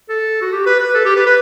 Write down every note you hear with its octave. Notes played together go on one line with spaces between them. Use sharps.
A4
F#4
G4
B4
B4
A4
G4
B4
B4